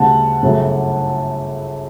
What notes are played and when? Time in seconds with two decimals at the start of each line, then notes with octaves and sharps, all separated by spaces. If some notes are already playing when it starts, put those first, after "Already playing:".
Already playing: D2 C#3 G3 F#5 A5
0.42 G1 F#2 C#3 F#3 A3